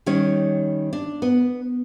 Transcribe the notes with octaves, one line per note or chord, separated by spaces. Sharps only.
D#3 G3 C#4 C#5
D4
B3